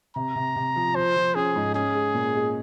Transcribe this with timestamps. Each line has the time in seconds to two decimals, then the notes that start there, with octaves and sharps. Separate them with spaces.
0.16 C3 A#5
0.36 C3
0.56 C3
0.76 F3
0.96 F3 C5
1.16 F3
1.35 C#4 G#4
1.56 G#2
1.75 C#4 G#4
1.95 G#3
2.14 A#2
2.35 G#3